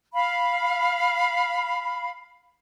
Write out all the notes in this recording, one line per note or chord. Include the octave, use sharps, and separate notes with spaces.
F5 B5